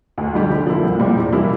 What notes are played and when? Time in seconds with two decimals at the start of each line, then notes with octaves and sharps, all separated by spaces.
0.18 D2
0.34 D3 G3 D4 G4
0.50 D3
0.67 F3 A#3 E4
0.83 C2
1.00 A#2 G3 C4 G4
1.16 E2
1.33 E3 G3 A#3 E4